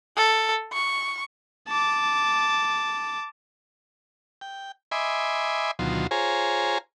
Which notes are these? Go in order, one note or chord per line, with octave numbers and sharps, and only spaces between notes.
A4
C#6
A5 D6
G5
D#5 E5 G#5 B5 C6 D6
D2 B2 D#3 F#3 F4 C6
F4 G#4 C5 C#5 G#5 A#5